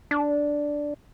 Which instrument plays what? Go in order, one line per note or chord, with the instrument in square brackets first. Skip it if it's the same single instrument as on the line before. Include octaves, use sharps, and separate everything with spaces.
[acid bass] D4